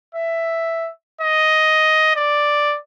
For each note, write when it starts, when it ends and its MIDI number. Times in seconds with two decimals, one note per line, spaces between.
0.15 0.90 76
1.21 2.15 75
2.16 2.77 74